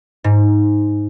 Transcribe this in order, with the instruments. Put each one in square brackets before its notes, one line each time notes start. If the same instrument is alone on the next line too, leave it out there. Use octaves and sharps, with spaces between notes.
[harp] G#2